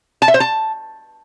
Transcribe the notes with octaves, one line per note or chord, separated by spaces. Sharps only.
A5
E5
C5
A5